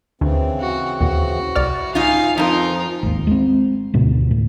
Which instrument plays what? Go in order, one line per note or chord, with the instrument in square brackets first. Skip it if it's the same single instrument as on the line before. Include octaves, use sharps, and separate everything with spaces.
[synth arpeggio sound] D2 [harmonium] C#3 E3 C4
[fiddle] F#4
[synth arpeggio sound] D#2 A#2 [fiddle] F#4
[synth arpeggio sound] C2 D5 F6 [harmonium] E4
[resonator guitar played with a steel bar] G#2 D#4 F4 [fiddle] F5 G#5
[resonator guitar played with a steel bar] F2 D#4 [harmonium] F3 [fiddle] F4 A#4
[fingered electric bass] G#1 D#2
G#3 C4
D2 G#2 B2
A2